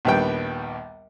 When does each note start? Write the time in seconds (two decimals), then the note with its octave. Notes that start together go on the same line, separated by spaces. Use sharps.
0.05 A#1 D#2 G3 B3 G5